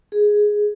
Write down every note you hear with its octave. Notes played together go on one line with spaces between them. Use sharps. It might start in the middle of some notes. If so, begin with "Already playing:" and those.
G#4